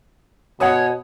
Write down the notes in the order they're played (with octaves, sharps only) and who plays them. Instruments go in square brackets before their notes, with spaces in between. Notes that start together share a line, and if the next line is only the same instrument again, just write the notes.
[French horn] B2 [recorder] C#5 [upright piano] F#5 G#5 D#6